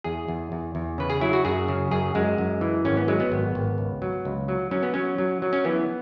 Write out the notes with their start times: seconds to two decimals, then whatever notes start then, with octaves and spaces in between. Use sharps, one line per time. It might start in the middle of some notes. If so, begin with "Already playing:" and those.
0.04 E2 G#4
0.28 E2
0.52 E2
0.75 E2
0.98 C#3 B4
1.10 G#4
1.21 F#3 E4
1.33 F#4
1.45 F#2 G#4
1.68 C#3
1.91 F#2 G#4
2.15 F#2 G#3
2.38 F#2
2.61 E3
2.85 G#1 C#4
2.97 B3
3.08 F#3 G#3
3.20 B3
3.32 G#1
3.55 G#1
3.78 C#2
4.02 F#3
4.25 C#2
4.48 F#3
4.71 F#3 C#4
4.83 B3
4.94 F#3 C#4
5.18 F#3
5.42 F#3
5.53 C#4
5.65 E3 B3